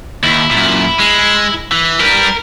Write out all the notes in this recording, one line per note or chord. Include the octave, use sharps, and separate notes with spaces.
D#2 E4
F#2 A#2
G#3
E3
G3 A#4 B4